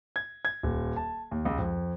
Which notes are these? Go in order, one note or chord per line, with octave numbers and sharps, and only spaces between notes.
G#6
G#6
D#1
A5
D#2
C#2
F2